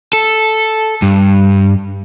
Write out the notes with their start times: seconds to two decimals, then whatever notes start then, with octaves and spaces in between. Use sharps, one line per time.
0.13 A4
1.02 G2